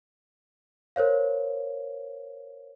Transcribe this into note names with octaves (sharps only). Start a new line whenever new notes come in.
A#4 C5 C#5 F5